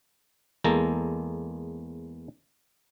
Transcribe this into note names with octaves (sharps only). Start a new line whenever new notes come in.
E2 G#3 A#3 A4 A#5